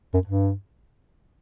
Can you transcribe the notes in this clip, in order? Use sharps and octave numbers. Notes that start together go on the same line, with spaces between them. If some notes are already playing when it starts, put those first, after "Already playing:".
F#2
G2